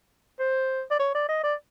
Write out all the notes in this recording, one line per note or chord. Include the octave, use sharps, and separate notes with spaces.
C5
D5
C#5
D5
D#5
D5